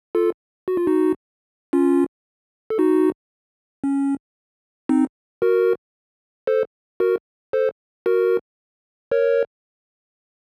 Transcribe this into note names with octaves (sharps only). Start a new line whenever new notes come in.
F4 A4
F#4
F4
D#4 F#4
C#4 F4
A4
D#4 F#4
C#4
C4 D#4
F#4 A#4
A4 C5
F#4 A#4
A4 C5
F#4 A#4
A#4 C#5